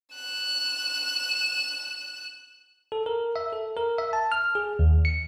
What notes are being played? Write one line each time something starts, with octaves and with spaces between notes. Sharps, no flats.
F#6 E7
A4
A#4
E5
A4
A#4
E5
A5
F6
G#4
D#2
C#7